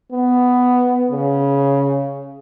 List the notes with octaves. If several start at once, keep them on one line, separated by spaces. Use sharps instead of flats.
B3
C#3